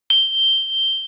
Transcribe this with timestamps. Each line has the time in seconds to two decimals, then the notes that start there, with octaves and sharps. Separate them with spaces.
0.10 G7